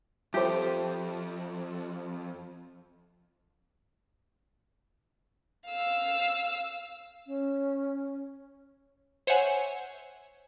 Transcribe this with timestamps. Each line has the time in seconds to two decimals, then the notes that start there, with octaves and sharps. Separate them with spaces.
0.34 F2 G4 A4 C5 E5 A5
5.68 F5 E6
7.26 C#4
9.27 C5 C#5 E5 F#5 G#5